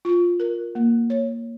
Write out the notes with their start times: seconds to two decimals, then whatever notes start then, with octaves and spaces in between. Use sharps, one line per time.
0.05 F4
0.40 A#4
0.75 A#3
1.10 C#5